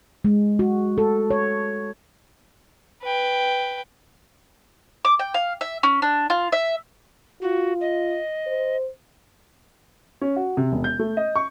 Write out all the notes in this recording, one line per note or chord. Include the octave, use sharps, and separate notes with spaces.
G#3
F#4
A4
C#5
B4 G5
D6
G5
F5
E5
C#4
D4
F4
E5
F4 F#4
D#5
C5
C#4
F#4
C3
E1
G6
A3
D#5
C#6